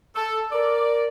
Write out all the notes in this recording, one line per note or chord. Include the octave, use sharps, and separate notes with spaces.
A4
A#4 D5